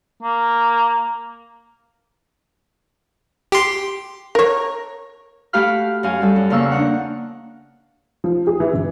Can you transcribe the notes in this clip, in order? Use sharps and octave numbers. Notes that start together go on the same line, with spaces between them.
A#3
G4 C6
A#4 C#5
A3 F#4 G4 F5 B5 F6
F#2 F#4 F5 G#5
G3 F#4 A4
F#2
E2 C#3 A#3 F5 C#6 E6
D4 D#4 F#5
F3
G#4
E3
G1